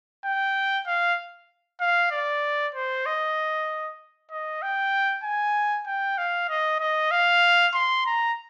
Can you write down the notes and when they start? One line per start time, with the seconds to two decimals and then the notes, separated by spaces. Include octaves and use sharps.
0.25 G5
0.87 F5
1.80 F5
2.11 D5
2.75 C5
3.06 D#5
4.31 D#5
4.62 G5
5.24 G#5
5.87 G5
6.18 F5
6.50 D#5
6.80 D#5
7.11 F5
7.74 C6
8.06 A#5